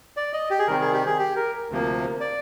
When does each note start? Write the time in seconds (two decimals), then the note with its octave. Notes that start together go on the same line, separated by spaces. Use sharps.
0.17 D5
0.33 D#5
0.50 G4
0.59 G#4
0.67 C3 D#3 G3 A#4
0.81 G#4
0.93 G4
1.06 G#4
1.19 G4
1.36 A#4
1.70 D2 C3 F3 A#3
2.20 D5